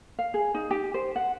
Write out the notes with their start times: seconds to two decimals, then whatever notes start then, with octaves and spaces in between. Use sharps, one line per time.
0.19 F5
0.34 G#4
0.54 D#4
0.71 G4
0.94 C5
1.16 F#5